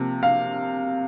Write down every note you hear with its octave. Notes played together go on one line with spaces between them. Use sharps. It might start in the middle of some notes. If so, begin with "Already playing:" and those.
Already playing: C3 F3 A#3
F5